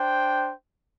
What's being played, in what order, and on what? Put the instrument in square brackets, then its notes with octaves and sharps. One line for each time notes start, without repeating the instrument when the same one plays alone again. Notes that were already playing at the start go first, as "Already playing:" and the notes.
Already playing: [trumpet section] D4 C5 G5